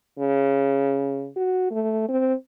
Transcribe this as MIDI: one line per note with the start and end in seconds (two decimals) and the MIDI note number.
0.19 1.28 49
1.36 1.70 66
1.71 2.06 57
2.08 2.33 60